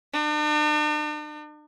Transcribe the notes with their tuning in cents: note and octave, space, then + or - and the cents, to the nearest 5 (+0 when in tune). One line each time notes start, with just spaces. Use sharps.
D4 +45